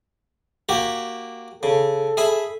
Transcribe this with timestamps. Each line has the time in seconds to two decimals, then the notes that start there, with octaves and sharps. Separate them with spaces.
0.69 A#3 F#4 G4
1.63 C#3 A4
2.17 G#4 E5 B5